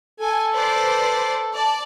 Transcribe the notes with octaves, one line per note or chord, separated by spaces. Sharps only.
A4 G#5
B4 C5 D5
D5 A5